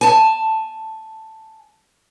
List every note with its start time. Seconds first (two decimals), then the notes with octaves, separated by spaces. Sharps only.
0.01 G#5 A5